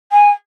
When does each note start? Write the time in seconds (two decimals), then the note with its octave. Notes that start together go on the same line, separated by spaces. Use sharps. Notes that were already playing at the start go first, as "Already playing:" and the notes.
0.12 G#5